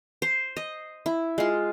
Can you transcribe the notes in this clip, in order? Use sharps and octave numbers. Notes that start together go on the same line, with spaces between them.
C5
D#5
E4
G#3 F4